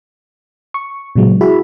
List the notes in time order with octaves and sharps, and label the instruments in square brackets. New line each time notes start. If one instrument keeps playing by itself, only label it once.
[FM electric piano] C#6
A#2 C#3 F#3 G#3
E4 F#4 G#4 E5 B5